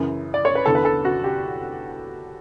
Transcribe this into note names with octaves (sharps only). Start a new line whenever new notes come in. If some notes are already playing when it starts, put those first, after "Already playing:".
Already playing: F#2 C#3 E3
D5
C#5
B4
E2 D3 A4
B4
A4
F#4
G4